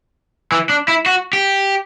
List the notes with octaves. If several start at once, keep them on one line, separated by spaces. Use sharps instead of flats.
E3
D4
E4
F#4
G4